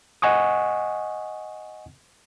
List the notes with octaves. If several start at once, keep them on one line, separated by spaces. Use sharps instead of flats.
D#5 F#5 G#5 C#6 D#6